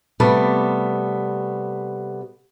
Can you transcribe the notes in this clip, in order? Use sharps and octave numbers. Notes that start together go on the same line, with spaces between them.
C3 G3 A3 B3